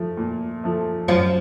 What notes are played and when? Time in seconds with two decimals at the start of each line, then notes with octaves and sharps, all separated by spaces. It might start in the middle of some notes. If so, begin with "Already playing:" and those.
Already playing: F3 A3
0.17 A#2
0.64 F3 A3
1.08 F#2 F3